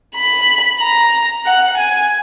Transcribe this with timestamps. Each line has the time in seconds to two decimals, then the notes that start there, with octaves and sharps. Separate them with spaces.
0.16 B5
0.80 A#5
1.46 F#5
1.78 G#5